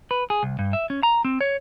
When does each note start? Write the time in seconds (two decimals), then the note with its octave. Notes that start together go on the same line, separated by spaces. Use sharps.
0.11 B4
0.30 G#4
0.43 C2
0.59 G2
0.73 E5
0.90 C#4
1.03 A#5
1.25 C4
1.41 C#5